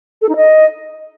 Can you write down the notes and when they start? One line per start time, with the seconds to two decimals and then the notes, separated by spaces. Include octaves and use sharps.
0.22 A4
0.29 D#4
0.36 D#5